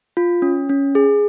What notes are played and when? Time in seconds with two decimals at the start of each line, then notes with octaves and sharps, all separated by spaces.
0.17 F4
0.42 C#4
0.69 C#4
0.95 G#4